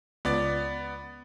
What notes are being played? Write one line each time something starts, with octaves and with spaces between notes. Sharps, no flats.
C#2 B3 D5 A6